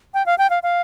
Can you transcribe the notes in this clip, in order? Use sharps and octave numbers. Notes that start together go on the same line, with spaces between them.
G5
F5
G5
F5
F5